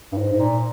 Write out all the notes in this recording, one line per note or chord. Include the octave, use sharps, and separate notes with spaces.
G2
G#2
G#2
A#2